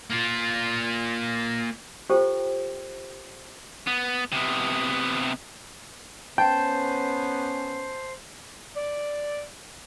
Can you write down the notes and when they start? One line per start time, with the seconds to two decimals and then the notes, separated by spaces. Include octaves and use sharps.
0.11 A#3 F4
2.10 F4 G4 A4 C5 G5
3.87 B3
4.32 C3 B3
6.38 B3 C#4 C5 G5 A5 G6
8.75 D5